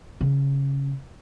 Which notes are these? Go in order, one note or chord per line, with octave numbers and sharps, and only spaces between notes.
C#3